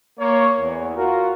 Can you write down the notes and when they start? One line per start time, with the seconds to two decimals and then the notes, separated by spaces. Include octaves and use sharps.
0.19 A#3 C#5
0.58 E2
0.96 F4 F#4 A#4